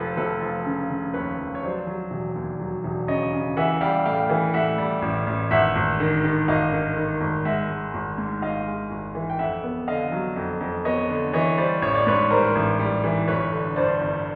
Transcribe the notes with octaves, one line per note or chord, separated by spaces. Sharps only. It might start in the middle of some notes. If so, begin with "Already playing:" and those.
Already playing: F1 F3 A4 B4
F1 A4 B4
F3
C#3
C#3
D#2 B4 C#5
F3
C#5
F#3 C5 D5
F#3
E1
D#2
F#3
E1
C#3 C#5 D#5
C#3
E3 E5 F#5
G3 F5 G5
A2 F5 G5
E3
A2 E5 F#5
G3
A1
A1
G#1 E5 F#5
G#1
D#3
D#3
G#1 D#5 F5
D#3
D#3
G#1
G#3 E5 F#5
G#3
G#1
G#2
G#1 D#5 F5
G#3
G#1
E3
G5
F2 E5 F#5
B3
D3 D#5 F5
F#3
F2
F2
B3 C#5 D#5
D3
E3 C#5 D#5
G3 C5 D5
A1 C#5
D5
G#2 B4 C#5
G3 A#4 C5
A1
G3
E3
G1 B4 C#5
D3
G2 C5 D5
G1